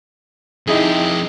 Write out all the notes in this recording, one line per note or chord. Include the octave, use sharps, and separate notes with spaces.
F2 D#4 E4 G4 G#4